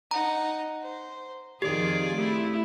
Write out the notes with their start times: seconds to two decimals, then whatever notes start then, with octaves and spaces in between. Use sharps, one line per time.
0.11 D#4 F#5 A#5
0.82 C5
1.62 F2 D#3 F4 G4 G#4 D5
2.14 A3 E4